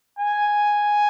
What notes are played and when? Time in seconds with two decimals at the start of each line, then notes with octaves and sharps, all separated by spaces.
0.19 G#5